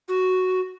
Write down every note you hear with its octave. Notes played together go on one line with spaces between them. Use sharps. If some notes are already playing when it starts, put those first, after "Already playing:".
F#4